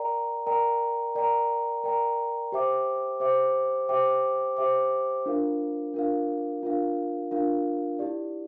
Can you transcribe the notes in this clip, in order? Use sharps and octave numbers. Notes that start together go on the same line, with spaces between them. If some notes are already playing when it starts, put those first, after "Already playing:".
Already playing: A#4 D5 G5 A#5
A#4 D5 G5 A#5
A#4 D5 G5 A#5
A#4 D5 G5 A#5
G4 C5 E5 G5 D6
G4 C5 E5 G5 D6
G4 C5 E5 G5 D6
G4 C5 E5 G5 D6
D4 F4 A#4 F5
D4 F4 A#4 F5
D4 F4 A#4 F5
D4 F4 A#4 F5
E4 G4 D5